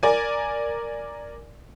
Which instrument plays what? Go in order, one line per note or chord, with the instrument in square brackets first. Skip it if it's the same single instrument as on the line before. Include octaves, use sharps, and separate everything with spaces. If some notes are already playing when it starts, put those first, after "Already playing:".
[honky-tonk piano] A#4 D5 G#5